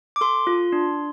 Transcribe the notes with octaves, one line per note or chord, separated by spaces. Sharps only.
D6
A4 C6
F4
D4